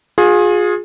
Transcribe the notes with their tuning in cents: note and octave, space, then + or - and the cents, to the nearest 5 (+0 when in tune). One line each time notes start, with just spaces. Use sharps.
F4 +35 G#4 +0